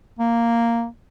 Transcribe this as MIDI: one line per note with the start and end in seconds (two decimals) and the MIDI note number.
0.19 0.87 58